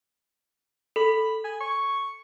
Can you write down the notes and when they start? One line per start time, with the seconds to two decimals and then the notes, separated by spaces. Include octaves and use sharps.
0.96 A4 B5
1.44 G#5
1.60 C#6